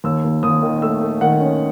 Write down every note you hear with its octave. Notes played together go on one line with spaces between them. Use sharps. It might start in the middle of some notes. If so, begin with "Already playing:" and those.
D#2 E6
D#2
D#2 D#6
D#3
A3 E6
A3
D#3 F#5
C#4